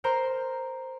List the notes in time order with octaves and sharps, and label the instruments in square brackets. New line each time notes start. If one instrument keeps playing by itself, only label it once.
[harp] A#4 C5 A#5 C6